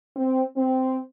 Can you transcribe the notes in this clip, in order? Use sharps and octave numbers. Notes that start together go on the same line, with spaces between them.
C4
C4